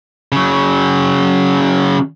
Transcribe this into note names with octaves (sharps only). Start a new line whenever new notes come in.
C#3 F#3